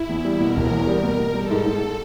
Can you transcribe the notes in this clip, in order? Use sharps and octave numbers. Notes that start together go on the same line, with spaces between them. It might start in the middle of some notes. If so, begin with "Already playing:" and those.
Already playing: E4
E2
G3
B2 A#4
E1
E2
G3 A#4
B2
B2
G3 A4
G#2
G#2